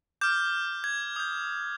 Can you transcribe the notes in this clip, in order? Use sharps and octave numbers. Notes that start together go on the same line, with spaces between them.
D6 F6 G6
G#6
D#6 G6